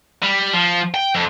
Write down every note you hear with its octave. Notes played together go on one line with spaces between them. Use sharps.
G3
F3
G5
F2